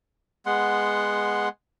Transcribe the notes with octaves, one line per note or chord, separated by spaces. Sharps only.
G#3 B3 F#5 C6